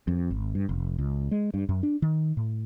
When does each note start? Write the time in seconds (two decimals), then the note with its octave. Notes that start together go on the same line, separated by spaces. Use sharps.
0.08 F2
0.31 G#1
0.55 G2
0.69 F1
0.98 C#2
1.31 G#3
1.54 G2
1.69 F#2
1.83 D4
2.02 D#3
2.37 A2